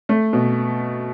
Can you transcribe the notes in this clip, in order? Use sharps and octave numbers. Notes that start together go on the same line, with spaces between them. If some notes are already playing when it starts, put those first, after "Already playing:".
A3
B2